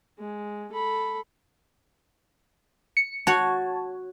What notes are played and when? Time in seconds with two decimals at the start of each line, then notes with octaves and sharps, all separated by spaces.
0.19 G#3
0.72 A4 B5
2.97 C#7
3.27 F#4 C#5 A5